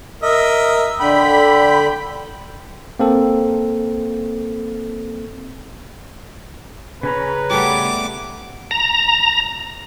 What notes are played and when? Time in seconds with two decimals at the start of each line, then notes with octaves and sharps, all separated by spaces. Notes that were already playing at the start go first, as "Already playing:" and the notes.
0.23 A#4 D#5 E5
1.00 D3 G5 B5
2.99 A#3 C4 A4
7.03 C#3 C#4 B4 A#5
7.50 G3 A3 B3 D6
8.71 A#5